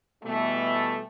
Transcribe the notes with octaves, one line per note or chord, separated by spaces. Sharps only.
B2 E3 G3 A3